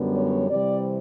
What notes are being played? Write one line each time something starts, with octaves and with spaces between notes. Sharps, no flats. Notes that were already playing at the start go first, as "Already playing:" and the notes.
Already playing: F#2 D3 G3 B3
C#5
C3 E3 G3 C4 D5